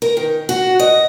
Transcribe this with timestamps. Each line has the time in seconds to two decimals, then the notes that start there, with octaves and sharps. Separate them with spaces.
0.02 A#4
0.17 D#3
0.49 F#4
0.79 D#5